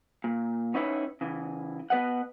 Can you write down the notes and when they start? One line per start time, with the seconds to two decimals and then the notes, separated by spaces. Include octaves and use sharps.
0.24 A#2
0.74 B3 C#4 D#4 E4 B4 C#5
1.21 C#3 E3
1.90 B3 B4 D#5 F#5